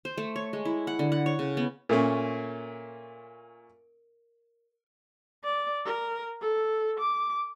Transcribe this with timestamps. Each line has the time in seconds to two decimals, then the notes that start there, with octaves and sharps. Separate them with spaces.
0.05 C5
0.18 A3
0.36 C#5
0.53 G#3
0.65 E4
0.87 F#5
0.99 D3
1.12 F#5
1.26 C#5
1.39 C#3
1.57 B3
1.89 A#2 A3 C#4 A#4
5.44 D5
5.86 A#4
6.41 A4
7.00 D6